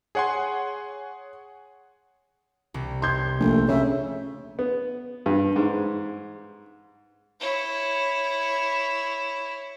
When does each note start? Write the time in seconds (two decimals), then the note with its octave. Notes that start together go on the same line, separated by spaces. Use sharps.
0.15 G#4 C#5 F#5 G#5 C6
2.74 C2
3.02 C6 G6 G#6
3.40 A#1 A3
3.68 C#3 C#5 E5
4.59 B3
5.26 G2
5.56 G#2
7.40 E4 C#5